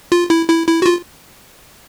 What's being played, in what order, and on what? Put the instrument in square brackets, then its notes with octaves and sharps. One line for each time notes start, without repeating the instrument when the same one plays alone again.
[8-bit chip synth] F4
E4
E4
E4
F#4
F4